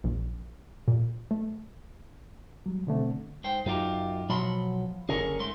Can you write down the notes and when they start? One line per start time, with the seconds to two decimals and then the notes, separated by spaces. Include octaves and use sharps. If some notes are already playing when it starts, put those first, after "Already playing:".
0.04 A#1
0.88 A#2
1.31 A3
2.66 F#3 G3
2.87 B2 D3 A3 C4
3.44 G#2 C5 G5
3.66 F#2 D#4 F4 G4
4.29 B2 F3 F#3 B5 C6
5.09 F#1 D3 C#4 G#4 A#4 C#5
5.39 G#2 A3 C6